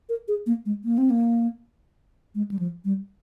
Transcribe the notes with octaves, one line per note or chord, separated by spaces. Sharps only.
A#4
G#4
A#3
G#3
A#3
C4
A#3
G#3
G3
F3
G3